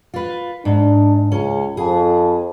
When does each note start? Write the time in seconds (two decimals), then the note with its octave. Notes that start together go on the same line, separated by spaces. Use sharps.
0.14 F4 B4
0.65 G#2 D4
1.32 C#2 C#4
1.77 F2 G#4